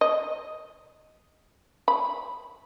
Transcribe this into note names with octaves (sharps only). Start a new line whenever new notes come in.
D#5
B5